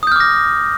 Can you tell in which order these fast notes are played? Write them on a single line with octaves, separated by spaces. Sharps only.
D#6 G6 F6 D6 A#6